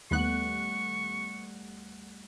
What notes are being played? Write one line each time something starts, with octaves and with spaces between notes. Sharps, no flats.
D#2 G3 A3 B3 F#5 C#6 F#6